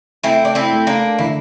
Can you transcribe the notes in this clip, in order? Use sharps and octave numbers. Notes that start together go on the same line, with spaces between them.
A3 C4 E4
D4
C4 E4
A3
A#3 D4
D3 E4